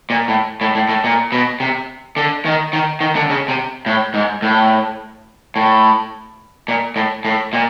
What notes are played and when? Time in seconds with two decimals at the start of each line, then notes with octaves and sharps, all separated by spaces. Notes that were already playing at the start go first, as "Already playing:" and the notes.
0.10 A#2
0.28 A2
0.61 A2
0.75 A2
0.89 A2
1.04 A#2
1.32 B2
1.60 C3
2.16 D3
2.45 D#3
2.73 D#3
3.01 D#3
3.16 D3
3.30 C#3
3.48 C3
3.86 A2
4.14 G#2
4.42 A2
5.56 A2
6.68 A#2
6.96 A2
7.25 A2
7.53 A#2